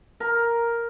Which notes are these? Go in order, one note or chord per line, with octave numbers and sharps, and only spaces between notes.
A#4